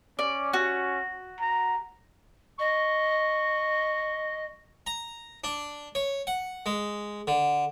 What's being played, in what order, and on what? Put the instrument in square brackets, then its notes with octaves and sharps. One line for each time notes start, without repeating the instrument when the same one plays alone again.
[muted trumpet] C#4 [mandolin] D5
[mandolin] F#4
[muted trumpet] A#5
[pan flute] D#5 [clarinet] C#6
[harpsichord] A#5
D4
C#5
F#5
G#3
D3